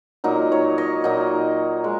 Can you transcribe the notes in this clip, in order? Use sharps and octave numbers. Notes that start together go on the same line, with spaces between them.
A#2 F#3 D#4
C#5
D#5
A#2 F#3 D#4
G#3